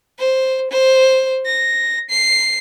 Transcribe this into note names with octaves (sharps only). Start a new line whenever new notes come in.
C5
C5
A#6
C7